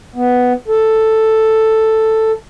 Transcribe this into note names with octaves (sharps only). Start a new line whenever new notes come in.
B3
A4